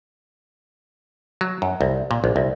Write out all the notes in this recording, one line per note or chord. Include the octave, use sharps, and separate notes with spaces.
F#3
F#2
C2
A#2
A#1
C2